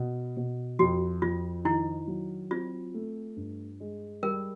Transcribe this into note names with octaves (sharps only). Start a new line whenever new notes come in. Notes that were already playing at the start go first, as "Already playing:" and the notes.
Already playing: B2
B2
F2 F#4
F2 F4
D#3 E4
F#3
C4 F4
A3
G2
G#3
G3 A#4